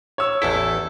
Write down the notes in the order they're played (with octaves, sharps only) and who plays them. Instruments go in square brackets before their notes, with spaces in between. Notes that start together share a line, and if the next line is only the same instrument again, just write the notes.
[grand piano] C#5 E6
[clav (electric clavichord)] A1 E2 E4 [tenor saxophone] A4